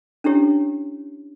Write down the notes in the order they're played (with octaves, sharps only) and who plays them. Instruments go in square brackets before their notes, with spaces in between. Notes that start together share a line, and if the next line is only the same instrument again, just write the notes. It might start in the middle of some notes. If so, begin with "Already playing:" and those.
[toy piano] C#4 D4 E4 G4 C#5